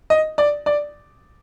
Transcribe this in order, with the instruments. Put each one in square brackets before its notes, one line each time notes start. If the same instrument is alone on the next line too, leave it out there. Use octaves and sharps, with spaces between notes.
[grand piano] D#5
D5
D5